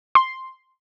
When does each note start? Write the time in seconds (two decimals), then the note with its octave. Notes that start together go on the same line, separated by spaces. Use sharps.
0.15 C6